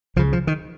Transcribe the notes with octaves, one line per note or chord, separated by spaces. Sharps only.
C#2 C#3 F3
F3
D#3